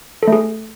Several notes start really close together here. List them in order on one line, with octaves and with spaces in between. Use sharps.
A4 A3 G#4